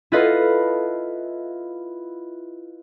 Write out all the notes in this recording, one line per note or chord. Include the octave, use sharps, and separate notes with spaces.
E4 F4 A4 B4 D#5 F5